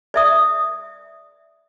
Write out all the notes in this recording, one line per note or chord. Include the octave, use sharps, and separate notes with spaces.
D5 E5 D#6